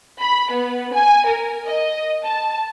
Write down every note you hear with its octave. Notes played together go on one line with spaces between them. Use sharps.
B5
B3
G#5
A#4
D#5
A5